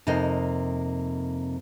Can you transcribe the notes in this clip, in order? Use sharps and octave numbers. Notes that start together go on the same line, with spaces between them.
F2 C3 A#3 D#4 D#5